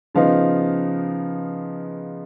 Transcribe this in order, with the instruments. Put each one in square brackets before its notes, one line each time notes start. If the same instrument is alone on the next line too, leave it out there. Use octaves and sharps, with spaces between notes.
[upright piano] C#3 F3 B3 D#4 F5